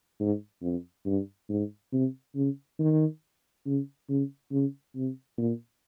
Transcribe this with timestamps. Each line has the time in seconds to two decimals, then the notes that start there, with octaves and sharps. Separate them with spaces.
0.20 G#2
0.62 F2
1.06 G2
1.49 G#2
1.92 C3
2.35 C#3
2.79 D#3
3.66 C#3
4.09 C#3
4.51 C#3
4.95 C3
5.38 A#2